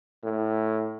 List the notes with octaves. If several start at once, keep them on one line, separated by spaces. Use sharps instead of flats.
A2